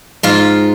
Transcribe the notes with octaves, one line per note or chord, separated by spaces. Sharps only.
G#2 F4